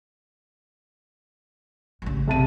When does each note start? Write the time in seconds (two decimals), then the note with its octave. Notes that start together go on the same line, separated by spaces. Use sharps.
2.02 A1 C#3
2.28 C3 A5 D#7